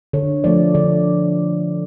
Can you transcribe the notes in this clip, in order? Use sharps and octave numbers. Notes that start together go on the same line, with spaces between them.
D3 C#5
F3 A3 D5
D3 D5